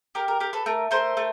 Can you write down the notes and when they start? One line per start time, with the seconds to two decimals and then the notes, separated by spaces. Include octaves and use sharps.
0.15 G4 A#4
0.28 A#4
0.40 G4 A#4
0.53 A4 B4
0.66 A3 A#4
0.91 A3 A#4 C5
1.17 A3